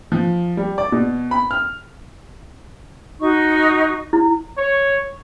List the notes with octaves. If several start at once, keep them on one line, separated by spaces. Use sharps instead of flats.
F3
G3
D5
B2
B5
F6
D#4 F#4 C#6
E4
C#5